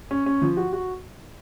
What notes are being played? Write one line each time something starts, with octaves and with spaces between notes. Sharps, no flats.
C#4
C#4
F3
F#4
F#4